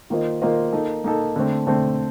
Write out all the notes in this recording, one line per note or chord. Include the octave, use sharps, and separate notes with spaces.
D#3 A#3 F4 C5 D#5
D#3 A#3 F4 C5 D#5
A#3 D#4 A4
A#3 D#4 A4
D3 A3 C4
D3 A3 C4